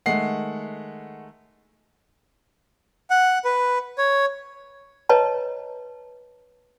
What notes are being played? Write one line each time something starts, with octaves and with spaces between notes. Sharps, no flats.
D#3 G#3 A3 F#5 C7
F#5
B4
C#5
B4 C#5 D#5 A5 A#5